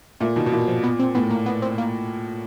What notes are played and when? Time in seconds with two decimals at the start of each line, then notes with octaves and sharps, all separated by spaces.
0.20 A#2 A3
0.36 B2 D#3
0.46 B2
0.52 A#2 E3
0.68 F3
0.84 B3
0.99 C4
1.15 A2 B3
1.31 A#3
1.46 B3
1.62 C4
1.78 A#3